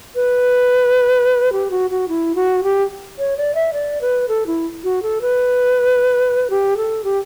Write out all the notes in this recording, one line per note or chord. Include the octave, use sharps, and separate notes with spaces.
B4
G4
F#4
F#4
E4
F#4
G4
C#5
D5
E5
D5
B4
A4
E4
F#4
A4
B4
G4
A4
G4